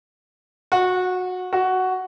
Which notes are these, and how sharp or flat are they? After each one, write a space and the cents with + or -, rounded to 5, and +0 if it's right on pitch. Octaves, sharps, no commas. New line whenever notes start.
F#4 -20
F#4 +5